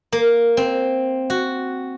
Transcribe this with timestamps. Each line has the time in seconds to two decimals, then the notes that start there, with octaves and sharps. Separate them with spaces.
0.12 A#3
0.57 C4
1.30 F#4